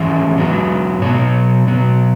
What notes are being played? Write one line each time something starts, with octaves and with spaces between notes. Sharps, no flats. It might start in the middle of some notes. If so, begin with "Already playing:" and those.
Already playing: G#2 E3 G#3 C#4 E5
G#2 F#3 B3
B2 F#3 B3 C#5
B2 F#3 B3